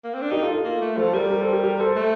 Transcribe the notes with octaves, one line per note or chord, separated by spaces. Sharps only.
A#3
C4
D4
D#4 G4 A#4
F4 A4
F4 A4
A#3
A3
F3 A4 C5
G3 G4 A#4
G4 A#4
A4 C5
G4 A#4
G4 A#4
A4 C5
A3